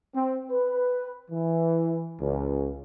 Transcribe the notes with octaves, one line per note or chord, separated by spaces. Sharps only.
C4
B4
E3
C#2